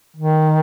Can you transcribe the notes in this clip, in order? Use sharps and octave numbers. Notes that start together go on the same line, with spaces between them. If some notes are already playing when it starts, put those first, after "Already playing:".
D#3